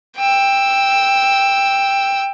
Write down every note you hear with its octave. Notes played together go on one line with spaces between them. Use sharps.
G5 E6